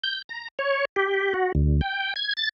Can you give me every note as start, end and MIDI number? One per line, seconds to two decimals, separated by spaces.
0.04 0.22 91
0.29 0.48 82
0.59 0.85 73
0.96 1.33 67
1.34 1.52 66
1.55 1.81 38
1.81 2.14 79
2.16 2.33 92
2.37 2.49 93